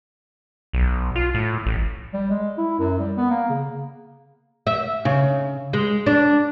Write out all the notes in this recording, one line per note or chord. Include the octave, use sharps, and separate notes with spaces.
B1
F4
A2
A1
G3
G#3
E4
F#2
G3
B3
A#3
C#3
E5
C#3
G#3
D4